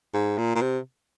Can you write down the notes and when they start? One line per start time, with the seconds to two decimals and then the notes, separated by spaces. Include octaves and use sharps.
0.14 G#2
0.38 A#2
0.55 A#2
0.61 C3